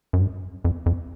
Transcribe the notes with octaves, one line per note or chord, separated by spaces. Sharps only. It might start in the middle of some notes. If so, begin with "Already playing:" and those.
F#2
G2
F2
F2